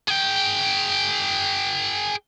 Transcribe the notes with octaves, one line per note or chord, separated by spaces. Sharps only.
G#4 G5